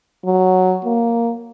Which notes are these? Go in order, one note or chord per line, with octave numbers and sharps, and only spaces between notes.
F#3
A#3